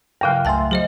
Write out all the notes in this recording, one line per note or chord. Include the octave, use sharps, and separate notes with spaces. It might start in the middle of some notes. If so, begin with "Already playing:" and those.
G2 C#3 F#3 F5 G5
C#2 A3 E5 G#5 A5 C6
F#3 G#4 C5 D#5